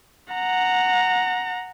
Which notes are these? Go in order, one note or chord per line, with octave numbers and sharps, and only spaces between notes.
F#5 A#5